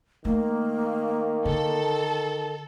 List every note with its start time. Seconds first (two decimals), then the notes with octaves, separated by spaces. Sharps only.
0.25 D#3 A3 A#3
1.45 D3 A4